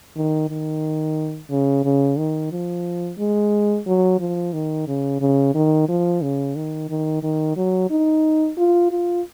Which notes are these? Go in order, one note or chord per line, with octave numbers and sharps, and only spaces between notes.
D#3
D#3
C#3
C#3
D#3
F3
G#3
F#3
F3
D#3
C#3
C#3
D#3
F3
C#3
D#3
D#3
D#3
F#3
D#4
F4
F4